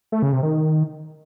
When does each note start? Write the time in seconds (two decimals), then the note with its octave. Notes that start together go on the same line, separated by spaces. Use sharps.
0.12 A3
0.22 C#3
0.33 C3
0.43 D#3